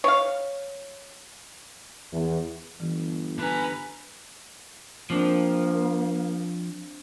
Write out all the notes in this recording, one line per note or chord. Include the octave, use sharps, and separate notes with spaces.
C#5 F5
E2
G1 E3
D4 B4 G#5 A#5
F3 A#3 C4 D4